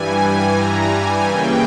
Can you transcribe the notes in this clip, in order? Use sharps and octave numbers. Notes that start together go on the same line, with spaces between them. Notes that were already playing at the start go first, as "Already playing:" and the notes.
Already playing: G2 E3 G3 G#5
A#5
G#5
C#3 E3 A#3 G5